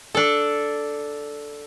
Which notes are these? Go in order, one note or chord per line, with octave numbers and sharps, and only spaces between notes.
D4 A4